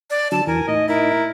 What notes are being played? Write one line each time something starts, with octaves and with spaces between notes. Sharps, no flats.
D5
D3 F#3 A5
E2 E3 A#4 G#5
A2 D#4 D#5
E4 A#4